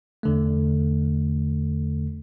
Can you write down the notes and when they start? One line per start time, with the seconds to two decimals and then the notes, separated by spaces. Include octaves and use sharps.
0.23 E2 D3 A3